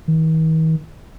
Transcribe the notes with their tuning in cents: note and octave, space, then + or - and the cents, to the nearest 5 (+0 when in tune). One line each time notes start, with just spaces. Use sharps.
D#3 +45